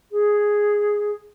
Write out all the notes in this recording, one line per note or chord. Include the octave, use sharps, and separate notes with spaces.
G#4